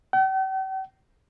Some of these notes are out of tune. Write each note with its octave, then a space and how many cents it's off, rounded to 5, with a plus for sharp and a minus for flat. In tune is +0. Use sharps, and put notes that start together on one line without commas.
G5 -45